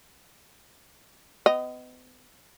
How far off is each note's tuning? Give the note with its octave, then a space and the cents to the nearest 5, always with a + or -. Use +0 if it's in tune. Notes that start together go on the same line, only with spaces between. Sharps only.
B3 +40 D#5 +0